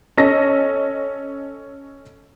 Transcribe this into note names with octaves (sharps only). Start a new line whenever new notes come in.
C#4 A4 D#5 A#6